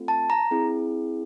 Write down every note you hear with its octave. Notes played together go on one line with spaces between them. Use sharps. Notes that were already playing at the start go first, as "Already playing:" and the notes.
Already playing: A3 C4 F4 A4
A5
A#5
C4 E4 G#4